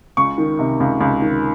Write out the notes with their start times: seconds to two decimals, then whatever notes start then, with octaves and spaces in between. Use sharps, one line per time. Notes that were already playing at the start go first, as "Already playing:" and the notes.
0.17 C#2 C#6
0.38 D#3
0.59 C3
0.80 C#2
1.00 C#2
1.22 D#3